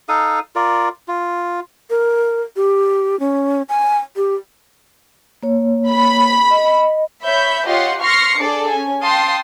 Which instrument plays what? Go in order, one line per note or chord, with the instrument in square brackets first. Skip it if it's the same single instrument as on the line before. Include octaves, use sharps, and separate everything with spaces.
[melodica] D#4 A4 F5 D#6
F4 A#4 D5
F4
[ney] A#4
G4
C#4
G#5
G4
[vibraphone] A#3 C#5
[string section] B5
[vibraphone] D#5
[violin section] C#5 E5 B5 G6
F4 G4 C#5 D#5 F#5 C6
C6 C#6 F6 A#6 C7 C#7
D4 G#4 A4 D5
C#4 G#5
F5 G5 A5 C6 D#6